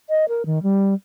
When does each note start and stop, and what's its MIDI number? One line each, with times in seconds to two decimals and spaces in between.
0.10 0.25 75
0.29 0.46 70
0.46 0.62 51
0.63 0.94 55